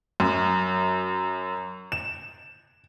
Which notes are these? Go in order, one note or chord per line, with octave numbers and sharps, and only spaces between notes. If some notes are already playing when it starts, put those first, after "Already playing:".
F#2
E7